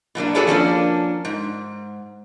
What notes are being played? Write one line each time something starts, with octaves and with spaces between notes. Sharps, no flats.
B2 F#3 A#3 D4
F#4 G#4 A4 B4 C#5 D5
F3 A#3 C#4 D4
G#2